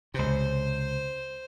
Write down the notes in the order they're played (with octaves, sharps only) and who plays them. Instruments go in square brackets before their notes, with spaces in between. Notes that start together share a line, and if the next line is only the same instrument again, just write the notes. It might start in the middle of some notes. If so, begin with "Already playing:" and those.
[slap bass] C#2 C3 [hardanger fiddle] C5